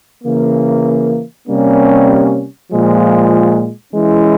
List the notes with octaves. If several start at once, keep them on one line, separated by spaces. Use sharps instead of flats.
C#3 E3 A#3
C3 G3 A#3 C#4
A#2 F3 G#3
E3 G#3 C#4 E4